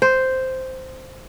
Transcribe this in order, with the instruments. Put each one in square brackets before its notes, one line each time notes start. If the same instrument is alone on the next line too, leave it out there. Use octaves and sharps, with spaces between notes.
[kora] C5